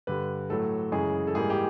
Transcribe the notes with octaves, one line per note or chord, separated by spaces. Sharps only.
G2 D3 G3 B4
A2 F#3 A3 A4
F#2 C#3 E3 G#3 G#4
A4
G#2 E3 G3 A#3 G#4
G4